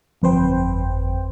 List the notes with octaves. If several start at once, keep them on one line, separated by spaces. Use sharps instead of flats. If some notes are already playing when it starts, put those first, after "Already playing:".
G1 F2 B4 C5 G5